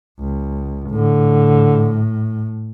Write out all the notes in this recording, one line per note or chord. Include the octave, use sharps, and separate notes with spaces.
C#2
A2 D3